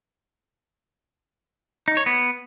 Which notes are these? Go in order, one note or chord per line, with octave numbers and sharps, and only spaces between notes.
D#4
C#5
B3